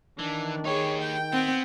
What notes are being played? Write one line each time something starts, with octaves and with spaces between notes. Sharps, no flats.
D#3 E3 D4
D#4 G4 G#4 C#5
G5
B3 C4